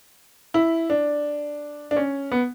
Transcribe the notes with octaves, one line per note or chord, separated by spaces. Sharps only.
E4
D4
D4
C#4
B3